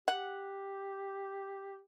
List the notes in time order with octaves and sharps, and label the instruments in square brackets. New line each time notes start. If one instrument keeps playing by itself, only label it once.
[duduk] G4 [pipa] F#5